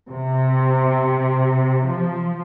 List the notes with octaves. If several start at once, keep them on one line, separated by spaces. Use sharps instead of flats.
C3
F3